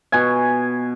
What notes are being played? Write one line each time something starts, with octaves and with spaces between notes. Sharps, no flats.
B2 G#5